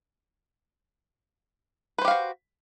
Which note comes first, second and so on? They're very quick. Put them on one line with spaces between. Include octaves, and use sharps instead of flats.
B4 C5 G4 F5 F#4